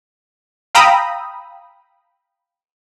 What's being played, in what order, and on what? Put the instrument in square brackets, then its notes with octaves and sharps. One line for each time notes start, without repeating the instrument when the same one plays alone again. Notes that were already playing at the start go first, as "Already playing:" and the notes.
[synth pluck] F5 G5 A#5 B5 D#6 E6